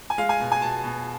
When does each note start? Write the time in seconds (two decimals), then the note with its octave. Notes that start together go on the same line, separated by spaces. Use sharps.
0.10 G#5
0.18 G#3 F5
0.29 G#5
0.40 B2
0.52 G#5
0.62 B2 A5
0.84 B2